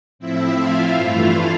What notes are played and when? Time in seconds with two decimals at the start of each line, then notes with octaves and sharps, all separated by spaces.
0.19 A2 F3 C4 E4 E5
0.56 F4 F5
0.93 G2 E3 A3 E4 F4 F5